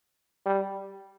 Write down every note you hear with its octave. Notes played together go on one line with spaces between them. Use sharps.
G3